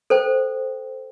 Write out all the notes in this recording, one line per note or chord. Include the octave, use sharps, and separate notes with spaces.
A4 C5 G5